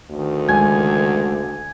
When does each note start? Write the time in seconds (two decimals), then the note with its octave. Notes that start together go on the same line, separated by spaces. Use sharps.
0.10 D2 D#3
0.49 C#2 G#5